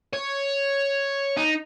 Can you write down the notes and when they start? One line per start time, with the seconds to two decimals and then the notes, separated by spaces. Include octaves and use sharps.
0.14 C#5
1.37 D#4